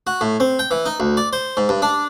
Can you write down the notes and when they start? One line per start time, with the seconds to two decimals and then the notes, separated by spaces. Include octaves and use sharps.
0.07 F#4
0.21 A2
0.40 C4
0.59 G5
0.71 E3
0.85 D#4
1.00 D2
1.17 D5
1.33 C5
1.57 G#2
1.69 G2
1.82 D4